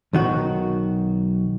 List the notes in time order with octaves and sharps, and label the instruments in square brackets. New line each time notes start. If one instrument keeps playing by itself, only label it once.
[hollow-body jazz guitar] B1 D#3 F#4